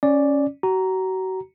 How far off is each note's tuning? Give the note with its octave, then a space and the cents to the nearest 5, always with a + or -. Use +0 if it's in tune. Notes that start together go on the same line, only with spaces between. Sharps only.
C#4 +0 D5 +0 D6 +0
F#4 +35 A#5 +0